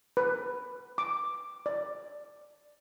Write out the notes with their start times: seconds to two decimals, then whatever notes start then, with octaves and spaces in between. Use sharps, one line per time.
0.17 B4
0.98 D6
1.66 D5